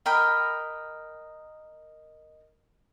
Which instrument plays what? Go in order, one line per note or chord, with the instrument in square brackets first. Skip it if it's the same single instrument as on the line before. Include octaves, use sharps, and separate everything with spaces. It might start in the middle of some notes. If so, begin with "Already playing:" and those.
[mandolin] A#4 D#5 G5 B5